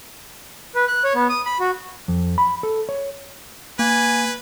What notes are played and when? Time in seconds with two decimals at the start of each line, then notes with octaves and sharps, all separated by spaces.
0.75 B4
0.88 F#6
1.04 C#5
1.15 B3
1.29 D#6
1.46 B5
1.60 F#4
2.08 F2
2.38 B5
2.63 A4
2.89 C#5
3.79 A#3 B4 G#5